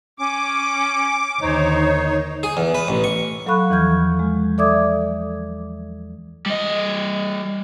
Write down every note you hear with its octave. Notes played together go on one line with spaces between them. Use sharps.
C#4 D6
D#2 D3 D#4 C5 C#5
G#4
E2
B4
A1
C#6
F#3 A4 F5 B5 C#6 F#6
E2 E3 F3 F6 G6 G#6
G#3
A4 D5 E5 D6 D#6 G#6
G3 D#5